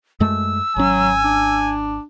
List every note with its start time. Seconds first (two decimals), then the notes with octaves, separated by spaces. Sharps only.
0.20 F#2 G#3 A3 E6
0.76 G#1 F#3 C#4 G#5
1.24 D4